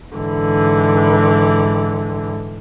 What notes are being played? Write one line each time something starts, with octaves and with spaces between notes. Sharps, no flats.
G#2 D3 E3